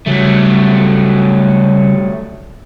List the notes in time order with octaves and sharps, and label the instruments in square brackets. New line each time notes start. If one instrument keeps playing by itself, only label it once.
[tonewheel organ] C#3 G3 [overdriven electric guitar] F#3 A3